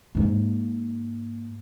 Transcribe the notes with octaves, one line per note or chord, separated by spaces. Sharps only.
G#2 A#3